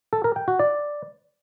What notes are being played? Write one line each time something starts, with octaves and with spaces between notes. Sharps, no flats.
A4
A#4
G5
F#4
D5